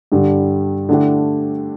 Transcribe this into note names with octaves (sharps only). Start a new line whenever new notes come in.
G2 D3 G3
D3 A3 D4 G4